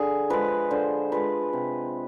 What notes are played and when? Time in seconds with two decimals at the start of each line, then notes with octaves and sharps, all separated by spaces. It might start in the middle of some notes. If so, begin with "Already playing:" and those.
Already playing: D3 G#4
0.30 F3 G#3 B4
0.71 D3 C5
1.12 F3 G#3 B4
1.53 C3